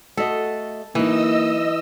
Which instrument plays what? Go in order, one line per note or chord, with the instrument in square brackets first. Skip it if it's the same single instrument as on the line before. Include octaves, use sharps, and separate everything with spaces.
[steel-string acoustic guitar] A3 F#4 D#5 [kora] A4
[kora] E3 [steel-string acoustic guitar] F#3 D#4 [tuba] A#3 [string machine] D#5 E6